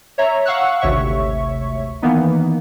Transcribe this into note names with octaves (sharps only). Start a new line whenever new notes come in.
C#5 E5 A#5
F5 F#5 C#6 E6 F#6
G#1 D2 C3 C#5 E5 C#6
D#3 E3 A#3 B3 D#4